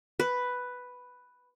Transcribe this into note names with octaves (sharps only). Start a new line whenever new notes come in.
B4